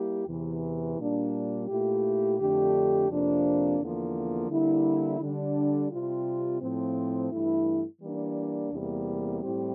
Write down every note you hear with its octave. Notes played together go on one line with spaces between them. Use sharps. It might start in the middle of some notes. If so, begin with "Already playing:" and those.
Already playing: G3 A#3 E4 G4
E2 C3 E3
A#2 G3 A#3 D4
A#2 A3 E4 G4
F2 D3 A3 D4 G4
F2 C3 F3 A#3 D4
E2 D3 F3 A#3
D3 G3 A#3 E4
D3 G3 D4
C3 G3 C4 F4
A2 F3 C4
G2 E3 A3 E4
E3 G3 A#3 D4
E2 C3 G3 A#3
A2 G3 C4 E4 G4